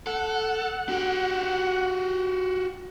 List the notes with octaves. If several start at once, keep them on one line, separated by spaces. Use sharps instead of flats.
A4 F#5
F#4 G4